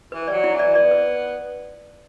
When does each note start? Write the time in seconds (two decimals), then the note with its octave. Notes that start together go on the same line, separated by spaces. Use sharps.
0.12 E3 B4
0.27 G3 D5
0.33 F#3
0.44 E4
0.55 E3 D5
0.75 B3 D5
0.91 B4